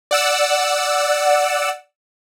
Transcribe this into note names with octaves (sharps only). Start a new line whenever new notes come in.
D5 F#5 E6